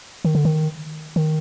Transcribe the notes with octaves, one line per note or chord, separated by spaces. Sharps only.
D#3
D3
D#3
D#3